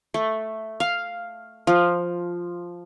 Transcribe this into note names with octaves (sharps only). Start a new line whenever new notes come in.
A3
F5
F3